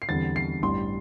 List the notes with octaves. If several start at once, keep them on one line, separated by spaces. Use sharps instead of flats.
C7
E2 D3 G3 C4 A6
C7
A1 G2 G3 D4 C6